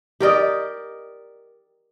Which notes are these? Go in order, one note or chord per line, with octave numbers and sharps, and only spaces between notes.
G4 A#4 D5 D#5